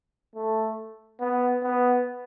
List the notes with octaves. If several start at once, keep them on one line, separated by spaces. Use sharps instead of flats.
A3
B3
B3